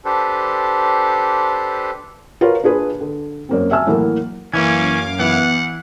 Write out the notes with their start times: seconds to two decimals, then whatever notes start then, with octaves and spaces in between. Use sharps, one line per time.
0.05 D4 G4 A4 B4 C5
2.41 F4 F#4 A#4 B4 C#5 F5
2.63 D4 F4 G#4 B4
3.01 D3
3.49 F#2 A#3 C4
3.71 E5 G#5 A5 E6 F6
3.87 A2 E3 F#3 A#3
4.53 F#2 E3 A#3 C#4 F5 D6 G#6
5.19 E3 B3 E4 F#5